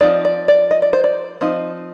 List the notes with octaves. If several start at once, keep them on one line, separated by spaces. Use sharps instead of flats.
F3 C4 D#4 D5
D5
D5
D#5
D5
C5
D5
F3 C4 D#4